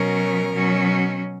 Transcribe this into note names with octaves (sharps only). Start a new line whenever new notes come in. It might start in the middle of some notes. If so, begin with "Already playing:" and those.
Already playing: B2 F#3 C#4 A#4
B2 F#3 C#4